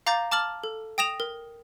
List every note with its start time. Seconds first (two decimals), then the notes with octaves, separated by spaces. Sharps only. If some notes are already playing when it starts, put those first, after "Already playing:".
0.06 F5 A#5 D6 G6 A6 A#6
0.31 A5 D6 F6 A6 F#7
0.64 A4
0.98 G5 D#6 A#6 E7 F7
1.20 A#4